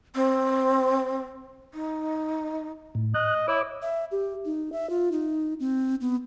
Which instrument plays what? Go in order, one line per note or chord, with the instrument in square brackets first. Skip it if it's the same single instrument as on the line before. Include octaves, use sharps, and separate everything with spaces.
[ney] C4
D#4
[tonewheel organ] A2
[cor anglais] D#5 [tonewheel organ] F#6
[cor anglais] E4 [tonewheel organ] C#5 D6
[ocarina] E5
G4
D#4
E5
F4
D#4
C4
B3